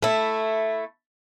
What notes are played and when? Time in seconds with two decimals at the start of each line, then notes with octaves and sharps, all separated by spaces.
0.03 A3 E4